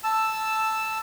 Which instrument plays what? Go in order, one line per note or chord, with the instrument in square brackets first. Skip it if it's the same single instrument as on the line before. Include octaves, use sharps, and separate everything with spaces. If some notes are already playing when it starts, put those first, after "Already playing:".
[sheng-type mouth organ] A5 E6